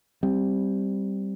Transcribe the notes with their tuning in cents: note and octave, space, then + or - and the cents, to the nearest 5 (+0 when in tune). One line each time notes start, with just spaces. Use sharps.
G3 +0 C4 +10